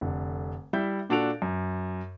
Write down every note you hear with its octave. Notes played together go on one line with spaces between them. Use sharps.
F1 D3
G3 E4 E5 G6
A#2 D4 F#4 A4 D7 F7
F#2